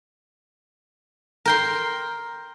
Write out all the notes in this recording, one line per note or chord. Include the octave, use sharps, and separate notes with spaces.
A#4 G5 C6